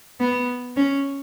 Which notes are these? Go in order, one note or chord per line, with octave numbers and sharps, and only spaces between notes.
B3
C#4